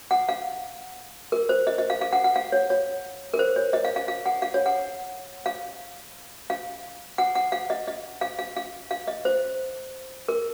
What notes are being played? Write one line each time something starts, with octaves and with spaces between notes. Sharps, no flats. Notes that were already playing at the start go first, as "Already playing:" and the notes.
F#5
F5
A#4
C5
D#5
D#5
F5
F5
F#5
F#5
F5
C#5
C#5
A#4
C5
C#5
D#5
F5
F5
F5
F#5
F5
C#5
F#5
F5
F5
F#5
F#5
F5
D#5
D#5
F5
F5
F5
F5
D#5
C5
A#4